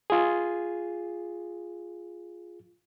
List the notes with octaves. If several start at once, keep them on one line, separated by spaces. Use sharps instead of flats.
F4 G#4